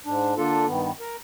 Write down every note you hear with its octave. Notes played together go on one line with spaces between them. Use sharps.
G#2 D4
D3 A#3 D4 F4 A4
G2 D#3 B3
A#4